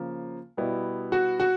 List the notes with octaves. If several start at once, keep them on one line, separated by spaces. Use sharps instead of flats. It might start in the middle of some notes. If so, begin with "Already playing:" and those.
Already playing: C#3 F3 A#3
B2 G3 B3 E4
F#4
F#4